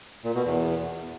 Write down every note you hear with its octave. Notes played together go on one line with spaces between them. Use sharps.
A#2
B2
E2